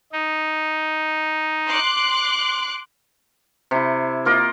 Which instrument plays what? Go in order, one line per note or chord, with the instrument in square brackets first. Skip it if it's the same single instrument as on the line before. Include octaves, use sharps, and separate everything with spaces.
[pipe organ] D#4
[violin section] C6 D6 F#6
[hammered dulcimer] C3 E4
A#3 F4 A#4 D#5